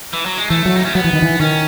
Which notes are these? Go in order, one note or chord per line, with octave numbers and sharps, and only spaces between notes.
E3
F#3
G#3
E3 A3
F#3
D#4
C#4
F#3 B3
E3
D#3
E3
D#3 C#4